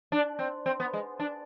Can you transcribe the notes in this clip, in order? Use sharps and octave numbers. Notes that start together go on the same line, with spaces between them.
D4
C4
C4
B3
G#3
D4